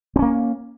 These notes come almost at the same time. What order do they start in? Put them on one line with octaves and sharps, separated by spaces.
C4 C#4 A#3